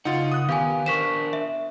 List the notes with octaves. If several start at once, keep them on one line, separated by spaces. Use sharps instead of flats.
C#3 D#4 F4 F#5
D#6 F#6
D#3 B3 G4 F5 G#5
D4 A#4 C5 C#6 B6 E7
E5